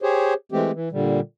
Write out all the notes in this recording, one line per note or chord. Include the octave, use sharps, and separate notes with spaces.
G4 G#4 C5 C#5
E3 G#3 A3 C4 G4
E3
A#2 D3 G3